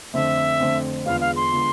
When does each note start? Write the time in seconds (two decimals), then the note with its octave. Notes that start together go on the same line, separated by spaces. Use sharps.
0.13 F2 D3 A3 C4 E5
0.60 F2 D3 A3 C4
1.06 E2 D3 G#3 B3 F4 F5
1.21 F5
1.36 C6
1.52 D3 G#3 B3 F4